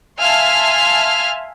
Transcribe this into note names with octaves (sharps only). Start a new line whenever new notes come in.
E5 F5 G#5 A5 C6 F6